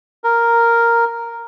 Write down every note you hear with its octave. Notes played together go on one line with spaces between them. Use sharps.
A#4